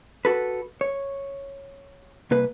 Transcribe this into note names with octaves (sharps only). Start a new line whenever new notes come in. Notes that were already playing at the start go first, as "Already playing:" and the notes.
F#4 A4 B4
C#5
C2 A#3 B4